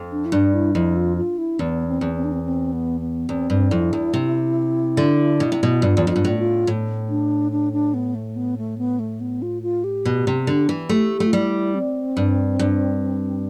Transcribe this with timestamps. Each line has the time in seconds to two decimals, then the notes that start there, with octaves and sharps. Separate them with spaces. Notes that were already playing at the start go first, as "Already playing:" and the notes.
Already playing: F2
0.11 D4
0.25 E4
0.32 G2 D4
0.54 E4
0.74 F2 E4
0.96 F4
1.17 F4
1.38 E4
1.59 E2 B3
1.87 C4
2.01 E2
2.16 C4
2.24 D4
2.32 C4
2.45 C4
2.73 B3
3.01 B3
3.29 E2 C4
3.50 G2
3.71 F2 E4
3.93 E2
4.14 C3
4.97 D3
5.40 B2
5.52 C3
5.63 B2
5.82 G2 F4
5.97 E2
6.07 F2 F4
6.16 G2
6.25 A2
6.39 F4
6.67 A2
7.09 D4
7.52 D4
7.73 D4
7.94 B3
8.15 A3
8.36 B3
8.58 A3
8.78 B3
8.99 A3
9.21 B3
9.42 F4
9.63 F4
9.84 G4
10.05 B2
10.27 C3
10.47 D3
10.69 E3
10.89 A3 G4
11.20 A3
11.27 F4
11.33 G3 E4
11.75 C4
12.17 G2
12.59 G2